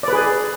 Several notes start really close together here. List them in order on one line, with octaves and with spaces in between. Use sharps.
D5 B4 G#4